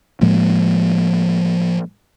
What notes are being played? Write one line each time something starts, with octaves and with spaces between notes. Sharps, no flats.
A2 F3 G#3 A#3